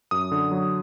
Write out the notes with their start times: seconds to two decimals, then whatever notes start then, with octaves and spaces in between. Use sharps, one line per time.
0.11 F#2 D#6
0.31 D3
0.52 F#3